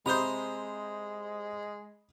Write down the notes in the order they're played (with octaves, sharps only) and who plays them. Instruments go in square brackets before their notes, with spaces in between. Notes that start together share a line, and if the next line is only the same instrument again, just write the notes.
[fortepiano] C3 [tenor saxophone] G#3 [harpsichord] C5 A#5 [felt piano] B5 D#6 G6